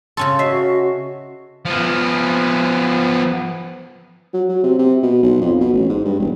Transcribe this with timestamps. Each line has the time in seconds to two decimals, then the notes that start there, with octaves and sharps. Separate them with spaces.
0.17 C#3 C#4 A4 C6
0.39 F#4 C#5 D#5 E5 C7
1.65 F3 B3
4.34 F#3
4.49 F#3
4.63 C3
4.79 C3
5.03 B2
5.23 B1
5.41 F2
5.61 B2
5.73 A1
5.89 G#2
6.05 G2
6.19 E1